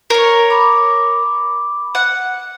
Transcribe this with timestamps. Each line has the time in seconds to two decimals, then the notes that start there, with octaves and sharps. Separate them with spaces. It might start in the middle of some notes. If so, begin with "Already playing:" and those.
0.10 A#4 C#5
0.50 B5 D6
1.95 F#5